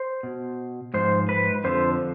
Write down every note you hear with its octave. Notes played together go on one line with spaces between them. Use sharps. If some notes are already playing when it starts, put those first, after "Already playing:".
Already playing: C5
B2
G#2 F3 C5
B4
F2 D3 F3 C5